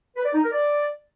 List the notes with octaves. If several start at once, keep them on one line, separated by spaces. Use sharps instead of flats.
B4
D5
D#4
A#4
D5